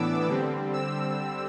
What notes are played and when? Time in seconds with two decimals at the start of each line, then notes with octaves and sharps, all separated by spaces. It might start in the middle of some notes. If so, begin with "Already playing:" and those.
Already playing: A2 E3 B3 D4 D6 E6
0.28 D3 G3 C4
0.73 E6